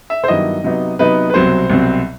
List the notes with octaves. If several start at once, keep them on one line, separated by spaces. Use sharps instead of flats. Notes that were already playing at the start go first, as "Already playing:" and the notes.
E5
C5
G2 D#3 F#3 B3 E4 D#5
C3 F#3 B3 D#4
C3 F#3 B3 D#4 B4
B4
C2 B2 F#3 C4 C5
C2 B2 F#3 C4